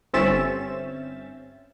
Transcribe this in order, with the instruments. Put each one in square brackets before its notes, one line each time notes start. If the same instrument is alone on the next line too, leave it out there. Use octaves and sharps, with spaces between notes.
[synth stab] G1 C4 C#4 E5 A6 E7